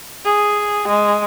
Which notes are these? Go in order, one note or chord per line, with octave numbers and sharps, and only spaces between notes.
G#4
G#3